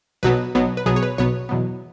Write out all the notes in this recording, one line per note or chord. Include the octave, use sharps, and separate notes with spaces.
B1 B2 F#3 B3 B4
B1 B2 F#3 B3
B4
B1 B2 F#3 B3 G#4
C#5
B4
B1 B2 F#3 B3 C#5
E2 B2 F#3 B3